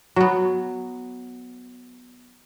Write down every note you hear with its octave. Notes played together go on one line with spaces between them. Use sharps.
F#3 B3